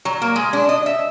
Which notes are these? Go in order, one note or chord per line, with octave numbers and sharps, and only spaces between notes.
F#3
A#3
G#3
D4
D#5
E5